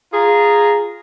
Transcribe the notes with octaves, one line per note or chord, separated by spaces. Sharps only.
F4 G#4 A#5